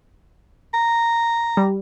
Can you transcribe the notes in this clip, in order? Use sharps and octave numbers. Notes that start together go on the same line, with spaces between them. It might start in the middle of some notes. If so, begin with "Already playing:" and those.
A#5
G3